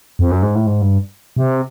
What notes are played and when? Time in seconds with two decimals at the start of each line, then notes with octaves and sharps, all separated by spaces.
0.19 F2
0.31 F#2
0.42 G#2
0.55 A2
0.66 G#2
0.82 G2
1.36 C3